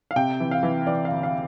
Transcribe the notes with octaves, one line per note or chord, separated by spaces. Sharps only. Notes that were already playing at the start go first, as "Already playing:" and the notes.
F5
C3 G5
E3
F5
E3
E3 D5
F5
D2
F5